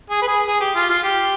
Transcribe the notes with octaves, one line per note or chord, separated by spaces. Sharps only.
G#4
B4
G#4
G#4
G4
F4
F4
G4